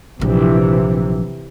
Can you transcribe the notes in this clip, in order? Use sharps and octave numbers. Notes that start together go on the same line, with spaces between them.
A#1 C3 E3 F#3